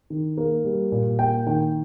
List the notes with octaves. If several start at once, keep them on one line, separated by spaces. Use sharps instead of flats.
D#3
A#3
G3
A#2
A#3 G5
D#3 G5